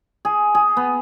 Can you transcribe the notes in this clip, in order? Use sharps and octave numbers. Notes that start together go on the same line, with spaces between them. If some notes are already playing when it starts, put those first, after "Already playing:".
G#4
G#4
B3